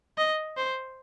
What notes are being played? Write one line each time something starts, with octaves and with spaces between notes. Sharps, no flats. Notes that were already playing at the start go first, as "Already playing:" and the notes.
D#5
C5